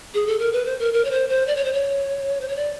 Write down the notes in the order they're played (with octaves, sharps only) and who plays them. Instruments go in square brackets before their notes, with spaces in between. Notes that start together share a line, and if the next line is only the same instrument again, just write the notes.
[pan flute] G#4
A4
A#4
B4
C5
A#4
A#4
C#5
C5
C5
D5
C#5
C5
C#5
C5
C#5
D5